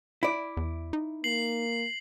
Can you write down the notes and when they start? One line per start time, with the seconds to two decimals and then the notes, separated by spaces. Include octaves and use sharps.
0.23 E4 D5
0.57 E2
0.93 D#4
1.24 A#3 C7 F#7